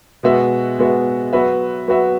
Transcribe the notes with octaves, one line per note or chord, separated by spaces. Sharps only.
B2 G#3 B3 F#4 E5
B2 G#3 B3 F#4 E5
F#3 B3 F#4 B4 E5
F#3 B3 F#4 B4 E5